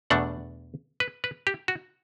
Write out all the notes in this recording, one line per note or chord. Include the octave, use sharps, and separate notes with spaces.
E2 B2 A3 D4 F#5
B4
B4
G4
F#4